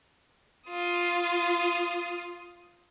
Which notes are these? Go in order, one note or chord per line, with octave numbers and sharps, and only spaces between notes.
F4 D#6